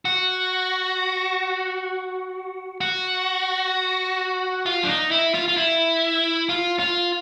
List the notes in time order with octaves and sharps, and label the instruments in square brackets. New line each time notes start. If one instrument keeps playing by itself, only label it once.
[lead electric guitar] F#4
F#4
F4
D4
D#4
E4
F4
F4
E4
F4
F4